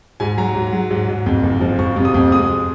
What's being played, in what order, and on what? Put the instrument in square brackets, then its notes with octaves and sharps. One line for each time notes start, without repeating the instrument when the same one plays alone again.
[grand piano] G#2 G#5
F#3 A#5
G#2
F#3
G#2
G#2
F2
F#1
F3
F3 C#6
C3
D#6
F2
G#3 D#6